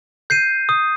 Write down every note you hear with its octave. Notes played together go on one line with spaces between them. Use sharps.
G6 C7 D#7
D#6